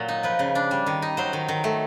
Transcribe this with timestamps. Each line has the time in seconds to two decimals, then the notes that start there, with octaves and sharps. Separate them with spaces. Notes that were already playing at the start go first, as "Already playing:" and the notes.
Already playing: A#2 F#3
0.08 D#4
0.23 F3 B4
0.39 C#3
0.55 D4
0.71 G3
0.86 D#3
1.02 D#4
1.17 F#3 C5
1.33 D#3
1.48 D#3
1.64 A3